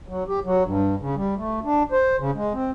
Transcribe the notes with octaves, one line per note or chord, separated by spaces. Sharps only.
F#3
G4
F#3
G2
C#3
G3
A3
D4
C5
C#3
G#3
C4